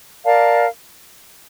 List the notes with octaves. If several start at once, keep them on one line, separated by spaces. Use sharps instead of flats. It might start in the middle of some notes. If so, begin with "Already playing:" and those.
A#4 D5 F5 A5